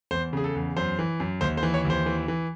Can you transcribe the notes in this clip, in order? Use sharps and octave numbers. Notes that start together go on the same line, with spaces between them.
E2 C5
C#3 G#4
A4
E2
F#2 C5
E3
F#2
D#2 C5
C5
E3
C#5
D#2 C5
E3
E3